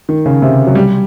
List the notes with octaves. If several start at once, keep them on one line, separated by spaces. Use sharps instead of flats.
D#3
C#3
C3
F#3
G3